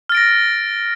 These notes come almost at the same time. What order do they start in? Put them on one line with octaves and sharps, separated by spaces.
F6 A6 D7 A#6